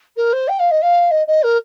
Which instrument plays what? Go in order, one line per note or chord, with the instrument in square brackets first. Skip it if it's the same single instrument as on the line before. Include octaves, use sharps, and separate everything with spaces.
[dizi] A#4
C5
G5
F5
D#5
F5
D#5
D#5
A#4